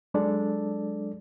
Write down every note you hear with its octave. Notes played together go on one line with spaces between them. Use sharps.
F#3 G#3 D4 A4 D5